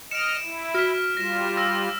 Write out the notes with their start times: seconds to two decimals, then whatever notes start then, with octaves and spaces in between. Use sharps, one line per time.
0.11 D#5 F6 C#7 D7 E7
0.44 E4
0.75 F#4 F6 B6
1.17 G3 F4 A#6 E7
1.57 E6 A#6